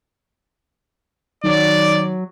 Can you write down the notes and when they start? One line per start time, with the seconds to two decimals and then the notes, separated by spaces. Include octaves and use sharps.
1.44 D#3 F#3 D5